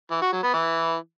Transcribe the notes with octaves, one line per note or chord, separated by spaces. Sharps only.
E3
F#4
F#3
B3
E3